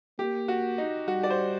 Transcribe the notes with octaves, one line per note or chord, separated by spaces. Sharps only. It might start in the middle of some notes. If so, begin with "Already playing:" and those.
A#3 G4
F#4
D#4
G3 F#4
D5
C5